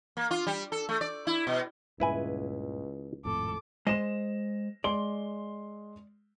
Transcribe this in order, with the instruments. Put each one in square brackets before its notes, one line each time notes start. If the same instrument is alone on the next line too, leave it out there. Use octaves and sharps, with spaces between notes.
[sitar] A#3
F4
G3
A4
A3
D5
E4
B2
[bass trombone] C#2 [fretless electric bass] G2 A#2 C#3 [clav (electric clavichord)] E4 B4 G#5
[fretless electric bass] G#1 F2 A2 [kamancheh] A4 D6
[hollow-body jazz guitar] G#3 C5 D#5 [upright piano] A#6 E7
[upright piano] G#3 C6 G7 [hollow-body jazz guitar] D5